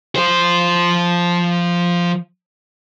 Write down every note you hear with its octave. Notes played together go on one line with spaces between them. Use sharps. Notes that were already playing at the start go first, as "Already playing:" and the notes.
F3 C5